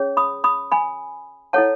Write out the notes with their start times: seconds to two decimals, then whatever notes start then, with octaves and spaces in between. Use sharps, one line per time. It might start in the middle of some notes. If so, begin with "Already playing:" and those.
Already playing: C#4 G#4 C#5
0.17 B5 D#6
0.44 B5 D#6
0.72 G#5 B5
1.53 E4 A4 C#5 F#5 A5